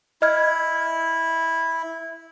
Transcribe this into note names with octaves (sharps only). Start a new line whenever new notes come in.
E4 D#5 F6 G#6